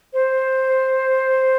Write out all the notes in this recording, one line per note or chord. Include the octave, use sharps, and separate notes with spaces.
C5